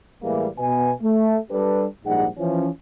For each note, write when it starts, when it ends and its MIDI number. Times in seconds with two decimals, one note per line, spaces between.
0.23 0.47 45
0.23 0.47 52
0.23 0.47 55
0.23 0.47 56
0.23 0.47 58
0.58 0.91 47
0.58 0.91 59
0.58 0.91 80
1.02 1.37 57
1.50 1.85 55
1.50 1.85 62
1.50 1.85 67
1.50 1.85 69
1.50 1.85 71
2.05 2.27 34
2.05 2.27 44
2.05 2.27 55
2.05 2.27 63
2.05 2.27 68
2.05 2.27 78
2.37 2.68 52
2.37 2.68 53
2.37 2.68 61